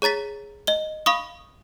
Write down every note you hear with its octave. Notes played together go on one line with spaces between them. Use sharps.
G#4 C#5 A#5 A6 B6
D#5 G7
F5 B5 C#6 D#6